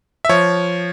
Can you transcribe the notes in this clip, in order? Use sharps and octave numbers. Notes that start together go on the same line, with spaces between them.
E5
F3 C#5